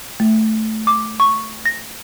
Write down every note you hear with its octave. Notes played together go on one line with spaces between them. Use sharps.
A3
D6
C#6
A#6